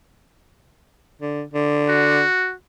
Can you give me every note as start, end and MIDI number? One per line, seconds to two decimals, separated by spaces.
1.21 1.43 50
1.54 2.22 50
1.89 2.53 66